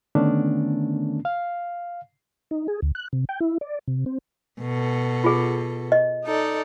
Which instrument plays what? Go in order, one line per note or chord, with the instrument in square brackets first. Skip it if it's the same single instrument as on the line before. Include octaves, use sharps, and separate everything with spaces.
[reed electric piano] D3 D#3 A3 B3 C#4 D4
F5
[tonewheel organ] D#4
G#4
D2
F#6
C3
G5
E4
D5
C3
C4
[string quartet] B2 A4
[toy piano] F4 G#4
D#5
[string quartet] D#4 A4 D5